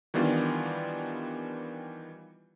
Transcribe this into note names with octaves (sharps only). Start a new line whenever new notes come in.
D#3 E3 G3 B3 D4 F4